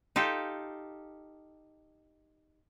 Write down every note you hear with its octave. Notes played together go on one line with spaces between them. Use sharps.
D#4 F4 G4 A4